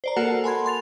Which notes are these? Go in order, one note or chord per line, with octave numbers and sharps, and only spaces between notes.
C5 D5 A#5
A#3 F#4 A4 A#4 F#5 A5
G#5 B5 C6 G#6
C6 A6 F7